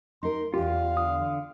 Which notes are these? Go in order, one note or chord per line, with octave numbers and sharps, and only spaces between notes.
D#4 A#4 C6
E2 F4 G4 F5
D3 D#6